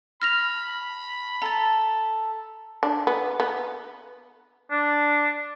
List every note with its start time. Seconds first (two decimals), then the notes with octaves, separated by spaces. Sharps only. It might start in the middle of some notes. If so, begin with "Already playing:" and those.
0.22 B5 F6 A#6 F7
1.42 A4 A#5 A6
2.83 D4
3.07 B3
3.40 B3
4.71 D4